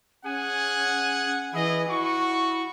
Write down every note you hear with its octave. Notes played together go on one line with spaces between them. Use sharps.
C#4 G#4 F#5 G#5
E3 E4 G#4 D#5
E4 F#4 C#6